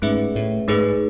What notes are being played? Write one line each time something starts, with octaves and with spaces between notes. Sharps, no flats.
G#2 A3 C#4 G#4 B4 E5
A2
G#2 A3 D#4 G#4 B4